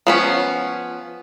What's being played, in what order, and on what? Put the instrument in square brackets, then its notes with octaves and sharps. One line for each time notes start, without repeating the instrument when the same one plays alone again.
[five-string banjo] F3 B3 C#4